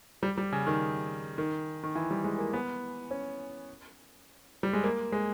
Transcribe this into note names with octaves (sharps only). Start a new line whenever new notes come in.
G3
G3
C#3
D#3
D#3
D#3
E3
G3
G#3
A#3
B3
C#4
G3
G#3
A#3
G#3